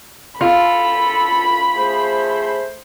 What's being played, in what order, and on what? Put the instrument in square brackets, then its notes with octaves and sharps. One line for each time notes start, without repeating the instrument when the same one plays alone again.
[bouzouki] F4 [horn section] A4 [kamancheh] B5
[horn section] A3 G#4 C5